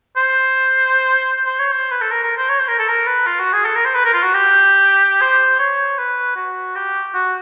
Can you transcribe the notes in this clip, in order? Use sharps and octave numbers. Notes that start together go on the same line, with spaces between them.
C5
C5
C#5
C5
B4
A4
A#4
A#4
C5
C#5
C5
A#4
A4
A#4
B4
F4
F#4
G#4
A4
A#4
C5
B4
A#4
F4
F#4
G4
C5
C#5
B4
F#4
G4
F#4